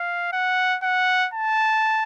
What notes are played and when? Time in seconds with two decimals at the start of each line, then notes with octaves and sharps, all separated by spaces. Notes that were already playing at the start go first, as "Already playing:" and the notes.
Already playing: F5
0.33 F#5
0.83 F#5
1.34 A5